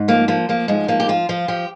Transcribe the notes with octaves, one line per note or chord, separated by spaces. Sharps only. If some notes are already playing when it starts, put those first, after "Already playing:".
Already playing: G#2
F3 A#3
F3 A#3
F3 A#3
G#2 G#3
F3 A#3
G4
F3 F4
F3 F4
F3 G4